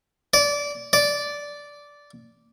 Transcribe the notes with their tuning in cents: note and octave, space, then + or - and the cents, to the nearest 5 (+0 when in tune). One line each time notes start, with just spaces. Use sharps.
D5 -20
D5 -10